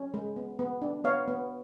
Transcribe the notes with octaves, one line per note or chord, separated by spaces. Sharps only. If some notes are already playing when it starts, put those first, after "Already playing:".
Already playing: C#4
G#3
B3
B3
D4
B3 C#5 F5
B3